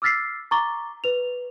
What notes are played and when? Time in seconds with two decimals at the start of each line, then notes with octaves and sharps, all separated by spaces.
0.02 D6 E6 F6 A6 B6 C7
0.51 A#5 C#6 D6 A6 G7
1.04 B4 F7